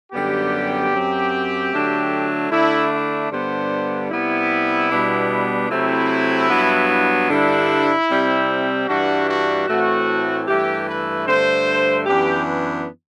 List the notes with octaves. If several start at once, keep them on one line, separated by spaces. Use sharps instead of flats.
F#2 D3 G3 B3 G4
F#2 F#3 C4
D3 F#3 A3 D4
D3 A3 D4 E4
E4
G2 D3 G3 B3 D4 C5
C3 G3 B3 E4
B2 G3 B3 D4
C3 F#3 A3 C4 E4
G2 F#3 B3 D4
G2 D3 G3 D4 E4
C3 G3 C4
G2 E3 G3 D4 F#4
F#4
A2 E3 A3 C4 F#4
G2 E3 A3 G4
B4
G2 D3 A3 C5
F#2 E3 B3 D4 G4